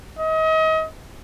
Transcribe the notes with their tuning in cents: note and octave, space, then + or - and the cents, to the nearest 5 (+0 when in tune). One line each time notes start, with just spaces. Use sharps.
D#5 +35